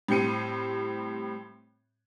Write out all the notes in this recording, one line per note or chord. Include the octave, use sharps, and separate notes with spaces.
A2 G3 C4 C#7 D#7